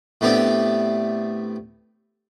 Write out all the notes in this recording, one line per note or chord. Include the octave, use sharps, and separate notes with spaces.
A2 A3 B3 C4 D4 G4